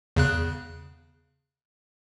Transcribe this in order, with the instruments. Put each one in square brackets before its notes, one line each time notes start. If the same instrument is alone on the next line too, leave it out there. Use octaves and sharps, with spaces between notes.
[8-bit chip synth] E2 C#3 F#6